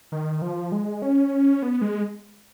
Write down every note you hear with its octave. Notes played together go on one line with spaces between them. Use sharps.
D#3
F3
G#3
C#4
B3
G#3